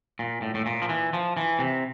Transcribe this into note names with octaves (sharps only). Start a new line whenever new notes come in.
A#2
A2
A2
A#2
F3
E3
F3
E3
C3